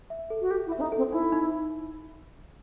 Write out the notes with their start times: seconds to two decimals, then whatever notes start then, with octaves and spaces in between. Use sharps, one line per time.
0.10 E5
0.30 A4
0.41 F#4
0.51 G4 A4
0.67 E4
0.72 E5
0.78 C4
0.81 D#4
0.92 A4
0.98 C4
1.12 D#4 E4
1.32 D#4